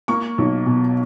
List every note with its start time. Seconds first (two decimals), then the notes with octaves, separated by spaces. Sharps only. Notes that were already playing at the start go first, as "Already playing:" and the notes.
0.08 A#3 C#6
0.38 B1
0.66 B2